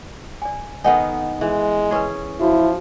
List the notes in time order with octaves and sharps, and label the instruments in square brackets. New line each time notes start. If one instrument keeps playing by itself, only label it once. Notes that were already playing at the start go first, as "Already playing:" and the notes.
[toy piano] D5 G#5
[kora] D#3 B3 D#4 [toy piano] A4 F#5 G#5
[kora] E3 [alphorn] G#3
[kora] C#4 G#4 [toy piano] E4 B4
[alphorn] F3 [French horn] E4 [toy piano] F#4